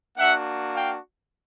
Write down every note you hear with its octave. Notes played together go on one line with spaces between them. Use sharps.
A#3 D4 F#4 E5 F#5
F5 G5